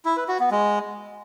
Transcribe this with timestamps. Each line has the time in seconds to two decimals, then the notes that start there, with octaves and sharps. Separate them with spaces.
0.05 E4
0.17 B4
0.28 F#4
0.40 B3
0.51 G#3